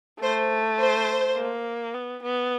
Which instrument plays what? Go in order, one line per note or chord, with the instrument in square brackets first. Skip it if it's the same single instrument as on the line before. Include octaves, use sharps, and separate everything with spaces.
[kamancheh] A3 [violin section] C5
[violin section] C5
[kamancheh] A#3
B3
B3